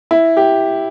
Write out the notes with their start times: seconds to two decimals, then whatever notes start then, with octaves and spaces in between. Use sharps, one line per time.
0.11 E4
0.37 G4